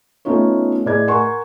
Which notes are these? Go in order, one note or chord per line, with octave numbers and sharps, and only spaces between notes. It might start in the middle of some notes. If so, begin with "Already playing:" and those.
A3 B3 C#4 D#4 F4 C#5
A2 G#4 D5 D#5 G#6
A#4 F#5 G#5 A#5 C6 C#6